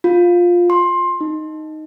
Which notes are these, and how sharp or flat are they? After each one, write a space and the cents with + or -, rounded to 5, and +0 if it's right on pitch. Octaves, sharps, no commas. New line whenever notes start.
F4 +10
C6 +20
D#4 +0